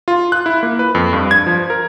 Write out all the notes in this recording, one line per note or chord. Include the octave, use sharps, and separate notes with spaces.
F4
F#6
E4
A#3
B4
F2
G2
G#6
F3
A#4